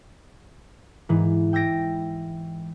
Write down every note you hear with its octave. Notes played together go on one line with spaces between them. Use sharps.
G#2 E3
G5 E6 G#6 A#6 D7